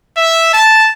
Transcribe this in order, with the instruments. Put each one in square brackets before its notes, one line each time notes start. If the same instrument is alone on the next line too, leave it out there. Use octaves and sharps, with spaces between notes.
[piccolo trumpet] E5
A5